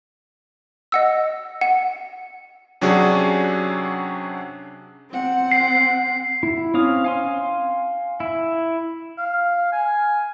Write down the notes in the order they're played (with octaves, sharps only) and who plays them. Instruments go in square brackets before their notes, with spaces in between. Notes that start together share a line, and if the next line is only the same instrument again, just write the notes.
[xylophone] D#5 F#5 E6
F#5
[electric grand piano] C3 F#3 C#4 D4 F#4 G#4
[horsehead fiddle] C4 F#5
[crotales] C7
[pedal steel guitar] E4
C4 C#4 F5 D#6
F5 G#5 C6
E4
[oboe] F5
G#5